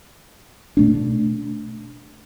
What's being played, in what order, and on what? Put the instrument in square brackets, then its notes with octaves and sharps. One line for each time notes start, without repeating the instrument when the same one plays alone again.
[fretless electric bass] B2 A3 D4